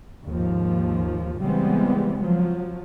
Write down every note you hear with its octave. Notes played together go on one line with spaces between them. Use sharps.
D#2 G#2 F3
C#3 E3 G3 G#3 B3 C4
F3 F#3